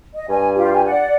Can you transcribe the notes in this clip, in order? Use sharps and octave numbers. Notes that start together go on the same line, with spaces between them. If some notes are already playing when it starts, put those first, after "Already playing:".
D#5
G2 G#5
F4 G4
G4 G#5
D5 F#5